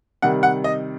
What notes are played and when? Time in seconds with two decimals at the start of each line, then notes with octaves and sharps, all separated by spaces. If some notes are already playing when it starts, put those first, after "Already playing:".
0.22 C3 D#3 G3 F#5
0.43 F#5
0.64 D#5